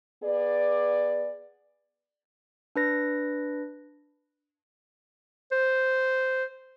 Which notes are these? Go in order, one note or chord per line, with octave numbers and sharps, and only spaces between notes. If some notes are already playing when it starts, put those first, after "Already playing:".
B3 G#4 D5
D4 B4 A#6
C5